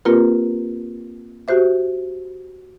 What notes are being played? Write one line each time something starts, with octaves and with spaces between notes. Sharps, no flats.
A#3 C4 F4 G4 A#4 B4
F#4 G4 C5 E5